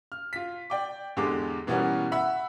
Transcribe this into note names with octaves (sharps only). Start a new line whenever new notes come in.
F6
F4 B6
D5 G5 D6
E2 D3 G#3 G4 D6
B2 E3 G3 B3 C#4 A#4
E5 F#5 B5